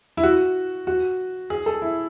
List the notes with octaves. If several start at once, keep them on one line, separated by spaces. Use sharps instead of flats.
E4
F#4
F#4
G#4
A4
E4